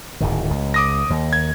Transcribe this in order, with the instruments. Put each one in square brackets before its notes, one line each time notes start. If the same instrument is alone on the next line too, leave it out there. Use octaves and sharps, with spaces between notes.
[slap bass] D1 G#2 D#3
C#2
[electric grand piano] D6 D#6 A#6
[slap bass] D#2
[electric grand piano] G#6